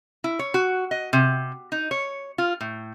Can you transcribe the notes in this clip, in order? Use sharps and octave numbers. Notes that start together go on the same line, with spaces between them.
E4
C#5
F#4
D#5
C3
D#4
C#5
F4
A2